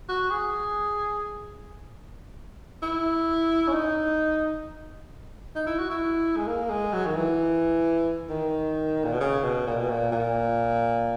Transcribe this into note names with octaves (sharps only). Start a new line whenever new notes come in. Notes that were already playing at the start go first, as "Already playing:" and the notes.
F#4
G#4
E4
C#4
D#4
D#4
E4
F#4
E4
G#3
A#3
G#3
F#3
D#3
E3
D#3
A#2
B2
C#3
B2
A#2
B2
A#2
A#2